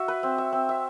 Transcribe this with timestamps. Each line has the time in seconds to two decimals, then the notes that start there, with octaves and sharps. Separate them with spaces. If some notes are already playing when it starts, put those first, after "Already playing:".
Already playing: F#4 E5
0.08 B4
0.23 C4
0.38 E5
0.53 C4
0.69 E5